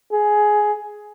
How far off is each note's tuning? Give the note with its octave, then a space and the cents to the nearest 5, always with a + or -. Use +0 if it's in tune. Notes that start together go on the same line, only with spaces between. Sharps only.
G#4 +10